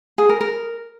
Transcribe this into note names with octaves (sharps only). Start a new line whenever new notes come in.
G#4
A#4
A#4